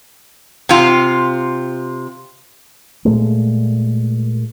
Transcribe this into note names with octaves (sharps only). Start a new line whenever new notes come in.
C3 F4
A#2 G#3 A3